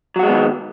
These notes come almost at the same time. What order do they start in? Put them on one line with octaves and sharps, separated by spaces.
F#3 F#4 G#3 B3 D#3